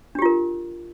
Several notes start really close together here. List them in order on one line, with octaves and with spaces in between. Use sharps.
D4 G4 F4 A#4